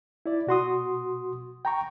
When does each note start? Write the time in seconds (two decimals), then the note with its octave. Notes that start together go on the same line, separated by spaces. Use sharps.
0.26 E4 D5
0.47 B2 F#4 C6 D#6
1.65 G5 A#5 C#6